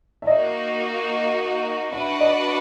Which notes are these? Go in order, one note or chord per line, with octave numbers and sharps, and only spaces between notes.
E5
A#3 D#4 F#4 D#5
D4 F#4 B4 D5 E5 F#5
D#5